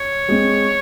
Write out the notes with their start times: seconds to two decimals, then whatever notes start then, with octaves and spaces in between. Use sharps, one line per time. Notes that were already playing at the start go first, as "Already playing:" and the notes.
Already playing: C#5
0.28 G#3 C4